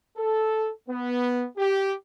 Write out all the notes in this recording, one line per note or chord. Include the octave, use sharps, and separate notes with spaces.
A4
B3
G4